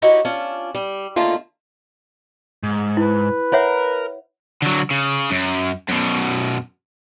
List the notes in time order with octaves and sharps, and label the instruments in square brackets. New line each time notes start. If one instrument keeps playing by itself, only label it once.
[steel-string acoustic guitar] D#4 E4 F#4 G4 C#5 D#5
C#4 D4 F4
G3
D3 D#3 A3 A#3 F4
[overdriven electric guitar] G#2
[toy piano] E4 [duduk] B4
[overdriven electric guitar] A#4 [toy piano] C#5 E5 F#5
[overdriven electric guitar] D3 F#3
C#3
F#2
F#2 B2